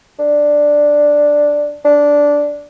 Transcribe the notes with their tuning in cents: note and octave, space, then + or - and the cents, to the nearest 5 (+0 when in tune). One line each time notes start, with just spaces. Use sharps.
D4 +0
D4 -10